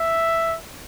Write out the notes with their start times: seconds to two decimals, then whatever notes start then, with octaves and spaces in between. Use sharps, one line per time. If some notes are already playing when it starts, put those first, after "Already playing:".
Already playing: E5